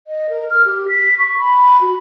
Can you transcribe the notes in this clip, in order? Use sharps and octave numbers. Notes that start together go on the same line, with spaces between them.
D#5
A#4
F6
G4
B6
C#6
B5
F#4